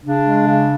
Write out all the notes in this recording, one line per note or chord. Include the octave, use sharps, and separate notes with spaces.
C#3 D4
G#3
C#3